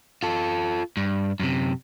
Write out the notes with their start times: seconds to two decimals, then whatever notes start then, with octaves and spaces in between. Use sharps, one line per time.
0.23 F4 A4
0.97 G2
1.40 F#2 C3